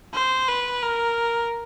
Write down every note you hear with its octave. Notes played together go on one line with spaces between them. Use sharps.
C5
B4
A#4